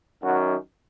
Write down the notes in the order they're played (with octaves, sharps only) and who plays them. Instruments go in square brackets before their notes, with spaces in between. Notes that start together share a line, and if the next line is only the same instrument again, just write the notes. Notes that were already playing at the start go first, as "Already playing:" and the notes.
[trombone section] F#2 D#3 F#3 F#4